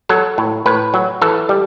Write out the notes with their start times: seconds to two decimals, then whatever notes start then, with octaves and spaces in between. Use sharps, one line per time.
0.09 F#3 A4
0.38 A2
0.66 A2 B4
0.94 F#3
1.22 E3 A4
1.49 G3